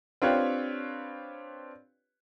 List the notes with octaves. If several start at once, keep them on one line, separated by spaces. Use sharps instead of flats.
C4 D4 F4 G4 B4 C#5